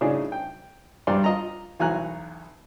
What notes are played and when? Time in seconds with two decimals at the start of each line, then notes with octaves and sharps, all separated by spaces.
0.01 A2 C#3 D4 D#4 G#4
0.32 G5
1.07 G2 G3 D4 D5 A#5 C6
1.24 F4 D#5 A#5
1.79 B1 E2 F#4 G#5 A#5 F#6